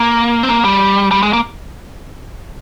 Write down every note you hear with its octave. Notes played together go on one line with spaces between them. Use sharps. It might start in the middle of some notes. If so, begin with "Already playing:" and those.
Already playing: A#3
C4
A#3
G3
G3
G#3
A#3